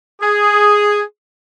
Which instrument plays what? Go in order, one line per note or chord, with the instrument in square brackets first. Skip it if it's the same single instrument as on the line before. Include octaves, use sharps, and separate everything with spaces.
[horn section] G#4